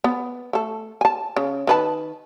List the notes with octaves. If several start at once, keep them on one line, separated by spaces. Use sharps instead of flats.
B3
A3 A4
G#5 A5
C#3
D#3 B4 A5